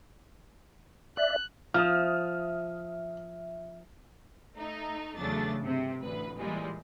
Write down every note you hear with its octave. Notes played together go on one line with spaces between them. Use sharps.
D5 E5 F#6
F3 E5 D#6 F6
A3 D#4
E2 C#3 F#3 A3 D4 A6
G2 C3
A1 D2 B4
A#2 E3 G3 G#3